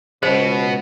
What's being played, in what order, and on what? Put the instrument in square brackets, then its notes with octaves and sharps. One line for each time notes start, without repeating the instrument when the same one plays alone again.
[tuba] C#2 [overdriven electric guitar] B2 B3 [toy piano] C5